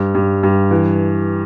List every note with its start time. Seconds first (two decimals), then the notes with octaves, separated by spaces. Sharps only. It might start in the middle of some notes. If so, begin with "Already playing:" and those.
Already playing: G2
0.15 G2
0.43 G2
0.71 E3